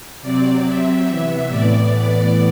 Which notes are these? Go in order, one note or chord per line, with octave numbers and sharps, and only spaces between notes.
C3 F#3 C4 D5
C3 F#3 C4 E5
C3 E3 B3
A2 E3 B3 D5